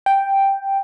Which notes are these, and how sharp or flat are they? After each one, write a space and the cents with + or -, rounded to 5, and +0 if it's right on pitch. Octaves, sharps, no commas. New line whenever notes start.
G5 +5